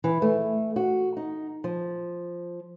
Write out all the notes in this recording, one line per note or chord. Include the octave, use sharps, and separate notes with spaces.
E3
A3
F#4
D#4
F3